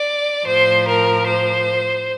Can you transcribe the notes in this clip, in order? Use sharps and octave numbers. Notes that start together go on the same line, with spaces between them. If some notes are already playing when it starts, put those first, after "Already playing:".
Already playing: D5
A2 F3 C5
A#4
C5